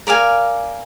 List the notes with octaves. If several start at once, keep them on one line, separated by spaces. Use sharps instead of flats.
A#4 D5 F5 G#5